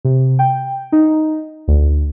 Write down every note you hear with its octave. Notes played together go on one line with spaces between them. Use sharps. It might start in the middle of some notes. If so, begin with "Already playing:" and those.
C3
G5
D#4
D2